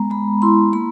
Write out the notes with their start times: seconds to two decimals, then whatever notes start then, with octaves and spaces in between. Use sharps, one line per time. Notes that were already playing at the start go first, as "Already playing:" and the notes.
Already playing: G#3 B3 A#5
0.10 G#3 B5
0.42 E4 C6
0.73 A#3 B5